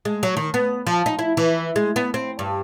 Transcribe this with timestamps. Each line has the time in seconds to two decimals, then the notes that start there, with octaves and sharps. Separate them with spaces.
0.05 G#3
0.23 F#3
0.37 D#3
0.54 B3
0.87 F3
1.06 D#4
1.19 E4
1.37 E3
1.76 G#3
1.96 B3
2.14 C4
2.39 G2